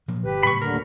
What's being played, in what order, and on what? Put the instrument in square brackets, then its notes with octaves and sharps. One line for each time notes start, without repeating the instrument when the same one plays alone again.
[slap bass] A#2 F3 F#3
[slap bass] G1 [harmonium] G4 B4
[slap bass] A2 C#3 F#3 [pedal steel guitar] B5 C#6
[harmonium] D#2 D3 [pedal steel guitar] A#4